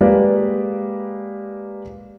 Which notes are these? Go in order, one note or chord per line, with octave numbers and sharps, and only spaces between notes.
G#3 A#3 G4 G#4 B4 D5